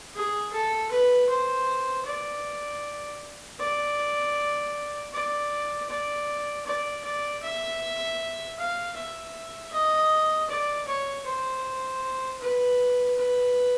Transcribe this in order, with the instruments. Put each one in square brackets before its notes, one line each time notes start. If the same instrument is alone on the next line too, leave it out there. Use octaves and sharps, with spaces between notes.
[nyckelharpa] G#4
A4
B4
C5
D5
D5
D5
D5
D5
D5
E5
F5
E5
D#5
D5
C#5
C5
B4
B4